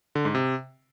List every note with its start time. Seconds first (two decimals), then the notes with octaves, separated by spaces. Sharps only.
0.15 D3
0.25 G#2
0.35 C3